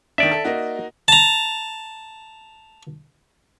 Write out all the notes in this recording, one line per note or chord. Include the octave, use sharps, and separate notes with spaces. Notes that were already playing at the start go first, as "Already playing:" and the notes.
D#3 D4 D5 E5
A4
A#3 D#4 F#4
A5 A#5